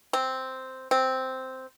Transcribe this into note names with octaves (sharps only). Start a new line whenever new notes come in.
C4
C4